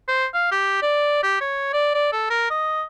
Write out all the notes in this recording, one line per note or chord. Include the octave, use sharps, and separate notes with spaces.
C5
F5
G4
D5
G4
C#5
D5
D5
A4
A#4
D#5